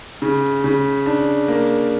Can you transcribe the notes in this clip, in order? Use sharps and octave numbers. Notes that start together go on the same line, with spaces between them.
C#3
C#3
D4
A#3